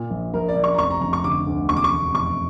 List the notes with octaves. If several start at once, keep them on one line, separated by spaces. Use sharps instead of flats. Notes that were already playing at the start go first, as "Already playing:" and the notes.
Already playing: A#2
A#1
A#1 A#4
D5
A#1
C#6
A#5
F1 C#6
A#5
F1 A#5
C#6
D3 D6
D2
E1 C#6
D6
C#6
E1
F1 C#6